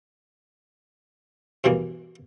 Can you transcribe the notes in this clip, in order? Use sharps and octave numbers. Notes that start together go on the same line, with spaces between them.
G2 B2 E3 A#3